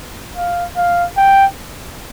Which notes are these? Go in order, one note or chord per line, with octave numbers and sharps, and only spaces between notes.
F5
F5
G5